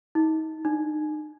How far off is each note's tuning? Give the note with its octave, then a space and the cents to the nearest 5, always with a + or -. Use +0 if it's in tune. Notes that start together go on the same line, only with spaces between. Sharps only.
D#4 +35
D#4 -35